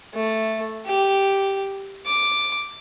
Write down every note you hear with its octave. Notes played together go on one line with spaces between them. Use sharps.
A3
G4
D6